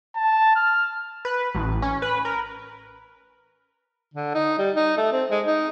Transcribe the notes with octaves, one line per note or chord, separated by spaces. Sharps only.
A5
F6
B4
A1
C#4
B4
A#4
D3
D#4
G3
D#4
A3
C4
G#3
D#4